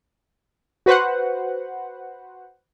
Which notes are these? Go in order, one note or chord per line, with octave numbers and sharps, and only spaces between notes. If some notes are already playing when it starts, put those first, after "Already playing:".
F#4 B4 C5 F#5